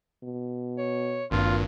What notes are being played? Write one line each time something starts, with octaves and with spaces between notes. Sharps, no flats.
B2
C#5
G#1 G2 A#2 F4